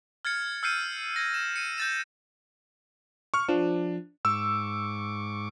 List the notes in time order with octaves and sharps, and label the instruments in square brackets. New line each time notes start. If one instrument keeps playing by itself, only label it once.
[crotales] F6 G#6 A6 C#7
E6 F6 G6 C7 C#7 D#7
G#6 A#6
E7
C#7 D#7
G6 A6 E7
[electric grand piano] C#6 F6
[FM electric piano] F3 [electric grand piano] D4
[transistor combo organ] G#2 C#6 D6 [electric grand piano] E6